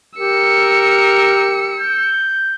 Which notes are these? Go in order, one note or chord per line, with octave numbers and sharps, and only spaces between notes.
G4 A#4 E6 C#7
G6